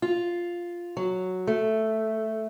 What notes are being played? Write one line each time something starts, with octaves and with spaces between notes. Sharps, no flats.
F4
F#3
A3